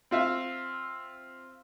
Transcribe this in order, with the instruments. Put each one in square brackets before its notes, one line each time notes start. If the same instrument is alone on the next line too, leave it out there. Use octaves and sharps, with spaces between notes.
[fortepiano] C4 F4 E5 F5